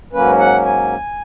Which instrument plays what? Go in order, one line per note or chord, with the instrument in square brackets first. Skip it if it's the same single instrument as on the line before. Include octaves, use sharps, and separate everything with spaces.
[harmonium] G#2 F#3 A#3 C#4 B4
F#5
G#5